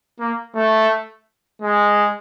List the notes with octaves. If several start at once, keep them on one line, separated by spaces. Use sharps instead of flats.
A#3
A3
G#3